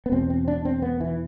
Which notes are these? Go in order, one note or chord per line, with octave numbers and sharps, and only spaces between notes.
B3
E2 B2 C4
C4
D4
C4
B3
E3